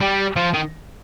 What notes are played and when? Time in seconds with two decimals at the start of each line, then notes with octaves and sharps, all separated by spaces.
0.01 G3
0.36 F3
0.54 D#3